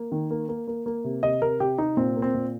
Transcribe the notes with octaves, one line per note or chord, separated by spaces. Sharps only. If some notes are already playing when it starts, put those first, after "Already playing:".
Already playing: A#3
D#3
A#3
A#3
A#3
A#3
C3
C3 D#5
C3 A#4
C3 G4
C3 D#4
A#2 C4
A#3
C4
A#2